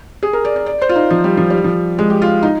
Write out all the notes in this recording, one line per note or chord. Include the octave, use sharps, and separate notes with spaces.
G#4
A#4
D5
D5
D5
C5
F4
D#4
F3
G3
F3
G3
F3
G#3
G4
F4
D#4